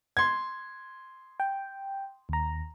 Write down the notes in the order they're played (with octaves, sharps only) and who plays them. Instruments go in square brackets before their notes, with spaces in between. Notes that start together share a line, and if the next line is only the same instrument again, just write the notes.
[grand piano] C6 G#6
[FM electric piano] G5
D#2 A#5